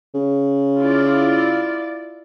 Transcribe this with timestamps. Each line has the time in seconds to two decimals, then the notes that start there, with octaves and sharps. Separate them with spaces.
0.14 C#3
0.81 E4 F4 D5